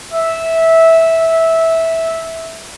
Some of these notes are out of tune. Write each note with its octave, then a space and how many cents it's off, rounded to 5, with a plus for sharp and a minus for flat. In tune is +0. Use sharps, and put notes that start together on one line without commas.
E5 -10